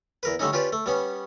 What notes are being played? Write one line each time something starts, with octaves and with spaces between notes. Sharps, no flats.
E2 A#4 B4
D3 G3 A3 C#4 D#4
C#4 F4 G4 B4 D5
A3
G3 B3 C#4